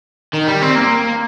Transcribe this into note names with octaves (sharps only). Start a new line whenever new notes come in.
D#3
G3
C4
A#3